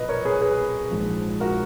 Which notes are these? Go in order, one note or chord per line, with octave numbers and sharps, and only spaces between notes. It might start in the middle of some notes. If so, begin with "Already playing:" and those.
Already playing: B1 A#2 F3 B4 D#5
A#4 C#5
G#4 B4
G#4 B4
A#1 G#2 F3
F#4 A#4